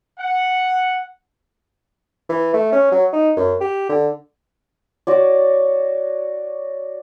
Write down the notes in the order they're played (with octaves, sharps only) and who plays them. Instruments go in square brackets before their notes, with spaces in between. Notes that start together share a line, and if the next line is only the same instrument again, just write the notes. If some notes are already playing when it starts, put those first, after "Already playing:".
[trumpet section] F#5
[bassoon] E3
A3
C#4
F#3
D#4
F#2
G4
D3
[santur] F#4 C#5 D5